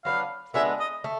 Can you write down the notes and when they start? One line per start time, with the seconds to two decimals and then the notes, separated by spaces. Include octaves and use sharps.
0.05 F#3 B3 D4 F5
0.54 G#3 B3 D4 E5
0.80 D#5
1.04 A3